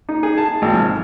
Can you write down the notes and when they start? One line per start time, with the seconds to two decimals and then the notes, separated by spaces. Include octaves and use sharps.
0.09 D#4
0.23 G#4
0.38 A5
0.62 G#1
0.74 F3